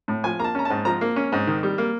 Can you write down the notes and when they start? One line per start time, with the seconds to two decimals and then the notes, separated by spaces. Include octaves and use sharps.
0.08 A2
0.24 F3 G#5
0.39 A#3 A#5
0.44 A5
0.55 C#4 A#5
0.65 G#2 A5
0.85 F3 A#5
1.01 A#3
1.16 C#4
1.32 G#2
1.47 D#3
1.63 G3
1.78 A#3